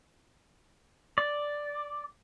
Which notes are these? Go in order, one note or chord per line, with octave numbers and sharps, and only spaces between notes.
D5